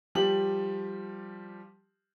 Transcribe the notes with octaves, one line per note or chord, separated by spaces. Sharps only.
F3 G3 G4 F#7